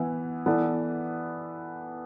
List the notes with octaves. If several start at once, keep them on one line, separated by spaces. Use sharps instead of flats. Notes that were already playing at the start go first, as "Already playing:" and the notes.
Already playing: E3 B3 E4
E3 B3 E4 A4 D5